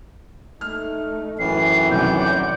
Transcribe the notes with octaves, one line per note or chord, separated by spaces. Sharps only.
A3 D#4 F6
F#2 A2 E3 C7
C3 D#3 F#3 D5 F#5 G6